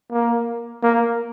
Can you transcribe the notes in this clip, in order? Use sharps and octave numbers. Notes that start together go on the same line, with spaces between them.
A#3
A#3